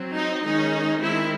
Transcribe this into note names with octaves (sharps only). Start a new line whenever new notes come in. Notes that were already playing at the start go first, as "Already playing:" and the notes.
Already playing: F#3 C4
D#4
D#3 G#3 C#4 D#4
D#3 G#3 C4 E4